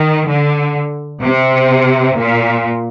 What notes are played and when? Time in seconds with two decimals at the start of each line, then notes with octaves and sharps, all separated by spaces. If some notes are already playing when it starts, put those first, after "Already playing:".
Already playing: D#3
0.27 D3
1.21 C3
2.16 A#2